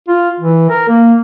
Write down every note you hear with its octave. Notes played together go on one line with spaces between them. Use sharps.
F4
E3
A#4
A#3